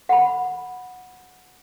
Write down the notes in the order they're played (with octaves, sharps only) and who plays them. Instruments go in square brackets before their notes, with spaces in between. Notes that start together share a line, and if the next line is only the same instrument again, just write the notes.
[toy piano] F#5 B5